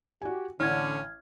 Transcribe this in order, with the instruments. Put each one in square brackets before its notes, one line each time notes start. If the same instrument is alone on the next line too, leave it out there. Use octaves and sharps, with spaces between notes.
[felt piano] F#4 G#5 [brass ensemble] G4
[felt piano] A1 [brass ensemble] D3 [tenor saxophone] C#4 [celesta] F6 G#6